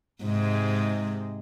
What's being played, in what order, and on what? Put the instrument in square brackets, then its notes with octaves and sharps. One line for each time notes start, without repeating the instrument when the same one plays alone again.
[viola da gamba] G#2 C3 G#3